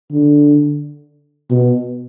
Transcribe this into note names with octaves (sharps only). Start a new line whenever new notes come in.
D3
B2